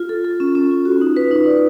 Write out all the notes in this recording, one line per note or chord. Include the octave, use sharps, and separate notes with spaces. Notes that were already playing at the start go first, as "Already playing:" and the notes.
Already playing: F4
A4
A4
C#4
C#4
F4
F#4
D#4
B4
D#4
D5